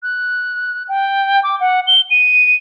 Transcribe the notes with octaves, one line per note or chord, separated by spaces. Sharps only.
F#6
G5
D6
F#5
G7
D#7